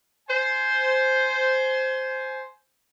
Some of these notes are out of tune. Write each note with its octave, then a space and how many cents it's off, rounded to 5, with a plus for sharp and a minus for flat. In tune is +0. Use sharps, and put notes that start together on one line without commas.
C5 +0 G#5 +20